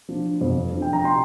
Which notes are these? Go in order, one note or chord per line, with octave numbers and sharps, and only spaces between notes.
F3 D4
F2
F3 D4
G5
A#5
C3 G5 C6